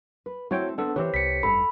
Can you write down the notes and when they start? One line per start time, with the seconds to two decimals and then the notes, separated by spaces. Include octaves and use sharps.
0.26 B4
0.51 A3 C4 E4 F#4 C#5 G5
0.78 B3 C4 D4 A4
0.96 D#3 E3 C4 G4 A4 B4 C#5
1.14 C2 B6 C#7
1.43 F1 G2 A4 B5